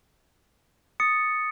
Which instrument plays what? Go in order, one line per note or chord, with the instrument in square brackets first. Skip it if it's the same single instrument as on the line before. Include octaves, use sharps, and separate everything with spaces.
[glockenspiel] D#6 A6 C#7